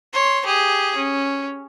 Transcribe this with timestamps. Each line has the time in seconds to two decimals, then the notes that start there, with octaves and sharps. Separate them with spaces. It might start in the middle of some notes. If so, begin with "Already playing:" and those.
0.13 C#5 C6
0.45 G4 G#4
0.96 C#4